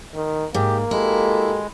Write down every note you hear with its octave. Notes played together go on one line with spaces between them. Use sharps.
D#3
G#2 A#3 G4
G#3 E4 F#4 G4 A4